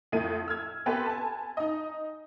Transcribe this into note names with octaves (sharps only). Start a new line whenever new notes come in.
F2 A2 A3 D#7
E6 F6 G#6
B3 C4 G4 A4 B4
G#5 A5
D#4 D#5